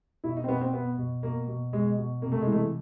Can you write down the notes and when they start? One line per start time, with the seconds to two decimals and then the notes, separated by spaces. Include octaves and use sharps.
0.24 B2 E4
0.37 D#4
0.44 C4
0.48 B2 B3
0.61 C4
0.73 B2 B3
0.98 B2
1.23 B2 A#3
1.48 B2
1.73 B2 G#3
1.97 B2
2.22 C3 A#3
2.32 A3
2.42 E3 G#3
2.52 A3